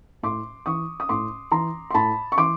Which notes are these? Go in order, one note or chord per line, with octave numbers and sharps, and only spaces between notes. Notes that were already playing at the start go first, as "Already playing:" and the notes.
A2 C6 D6
E3 C#6 D#6
D#6
A2 C6 D6
E3 A#5 C6
C6
A2 A5 B5
C#6
E3 C6 D6